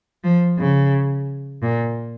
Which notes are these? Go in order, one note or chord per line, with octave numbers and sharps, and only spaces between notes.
F3
C#3
A#2